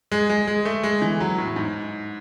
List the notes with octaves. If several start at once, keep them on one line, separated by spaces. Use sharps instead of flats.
G#3
G#3
G#3
A3
G#3
E3
F#3
A2
G#2